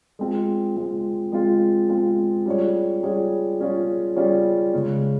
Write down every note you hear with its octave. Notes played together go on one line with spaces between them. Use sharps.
G#3 C4 F4
G#3 C4 F4
G#3 C4 F4
G#3 C4 F4
G3 C#4 F4 G#4 C#5
G3 C#4 F4 G#4 C#5
G3 C#4 F4 G#4 C#5
G3 C#4 F4 G#4 C#5
C#3 G#3 C#4